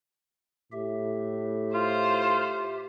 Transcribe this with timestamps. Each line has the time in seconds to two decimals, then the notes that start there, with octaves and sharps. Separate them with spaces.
0.72 A2 G4 E5
1.74 F4 C5